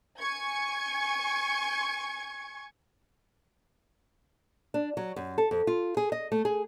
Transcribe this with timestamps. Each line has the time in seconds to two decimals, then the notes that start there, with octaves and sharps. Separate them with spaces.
0.19 G#5 C#6 G#6
4.74 D4
4.97 F#3
5.16 F#2
5.38 A4
5.51 F2
5.67 F4
5.97 G#4
6.12 D#5
6.32 A3
6.45 G#4